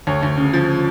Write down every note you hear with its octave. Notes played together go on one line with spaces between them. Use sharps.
D2 C#5
D2
C#3
F3